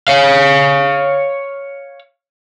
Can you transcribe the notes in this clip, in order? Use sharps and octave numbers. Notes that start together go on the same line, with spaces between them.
C#5 F5